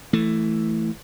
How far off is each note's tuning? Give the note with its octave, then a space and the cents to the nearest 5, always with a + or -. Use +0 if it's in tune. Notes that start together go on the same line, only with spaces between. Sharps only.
E3 +0 A3 +0